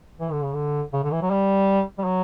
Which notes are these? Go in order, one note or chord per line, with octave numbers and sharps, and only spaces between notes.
E3
D3
C#3
D3
C#3
D3
E3
F#3
G3
G3
F#3